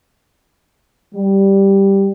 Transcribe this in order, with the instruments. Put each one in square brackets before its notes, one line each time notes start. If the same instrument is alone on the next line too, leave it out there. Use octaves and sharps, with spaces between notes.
[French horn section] G3